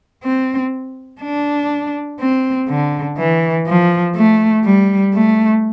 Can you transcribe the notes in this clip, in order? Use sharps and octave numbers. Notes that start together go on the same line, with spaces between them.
C4
D4
C4
D3
E3
F3
A3
G3
A3